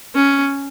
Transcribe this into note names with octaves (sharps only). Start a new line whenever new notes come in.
C#4